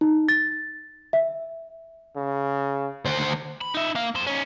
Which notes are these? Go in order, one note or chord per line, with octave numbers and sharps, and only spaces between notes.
D#4
A6
E5
C#3
D2 C5
B5
D#4 E5
A#3 F5
F2 C5
C#4 D#4